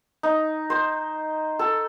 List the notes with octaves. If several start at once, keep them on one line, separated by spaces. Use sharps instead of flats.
D#4
C5
A4